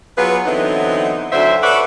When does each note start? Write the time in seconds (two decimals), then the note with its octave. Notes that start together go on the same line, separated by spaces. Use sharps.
0.17 F#3 B3 F4 G#4 B4
0.45 D3 E3 F#3 B3 C4 D#4
1.32 D2 D3 F#3 C5 E5
1.63 A4 B4 C#5 D5 E5 F#5